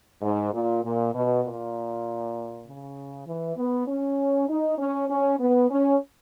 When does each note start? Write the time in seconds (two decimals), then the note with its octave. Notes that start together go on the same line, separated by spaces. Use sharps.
0.22 G#2
0.53 A#2
0.83 A#2
1.14 B2
1.44 A#2
2.66 C#3
3.27 E3
3.57 B3
3.88 C#4
4.49 D#4
4.78 C#4
5.09 C#4
5.39 B3
5.70 C#4